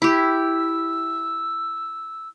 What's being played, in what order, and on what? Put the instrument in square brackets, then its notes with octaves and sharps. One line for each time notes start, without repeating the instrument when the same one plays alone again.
[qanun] E4 G4 [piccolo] E6